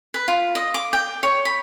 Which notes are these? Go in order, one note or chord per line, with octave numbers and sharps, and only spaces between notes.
B4
F4
D#5
D6
G5
C#5
B5